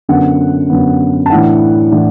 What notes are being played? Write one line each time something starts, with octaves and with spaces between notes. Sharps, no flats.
F#2 D3 B3 F#5
F#2 D3 B3
A5
A2 E3 D4 F#5
A2 E3 D4